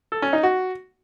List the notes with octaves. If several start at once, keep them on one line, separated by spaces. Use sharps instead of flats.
A4
C#4
D#4
F#4